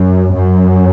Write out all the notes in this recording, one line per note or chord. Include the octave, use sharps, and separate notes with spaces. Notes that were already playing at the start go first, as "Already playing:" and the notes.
Already playing: F#2
F#2